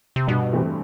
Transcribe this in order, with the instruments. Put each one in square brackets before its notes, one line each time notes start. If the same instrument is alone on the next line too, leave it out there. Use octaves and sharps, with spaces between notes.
[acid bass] C3
[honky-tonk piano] G2 [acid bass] B2
[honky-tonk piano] E3 A3 C4 G4